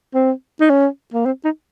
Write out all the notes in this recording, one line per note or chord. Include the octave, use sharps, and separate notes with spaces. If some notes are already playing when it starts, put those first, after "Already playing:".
C4
D#4
C#4
A#3
C4
D#4